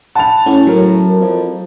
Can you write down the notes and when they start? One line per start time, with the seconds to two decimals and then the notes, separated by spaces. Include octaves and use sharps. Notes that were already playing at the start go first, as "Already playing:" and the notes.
0.15 F#5 A5 B5 F7
0.46 A2 C#4
0.67 F#3 A#4
1.21 F2